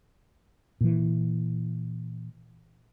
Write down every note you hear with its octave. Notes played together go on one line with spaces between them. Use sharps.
A#2 E3